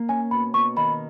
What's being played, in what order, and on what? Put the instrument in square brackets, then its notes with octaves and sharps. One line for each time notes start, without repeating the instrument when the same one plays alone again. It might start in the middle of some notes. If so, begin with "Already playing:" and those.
Already playing: [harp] A#3
[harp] C#4 [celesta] G#5
[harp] B2 [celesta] B5
[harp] B2 [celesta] C#6
[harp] D#3 [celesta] B5